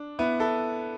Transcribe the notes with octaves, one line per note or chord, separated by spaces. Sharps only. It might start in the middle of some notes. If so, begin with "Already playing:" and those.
Already playing: D4
B3 E4
E4 A4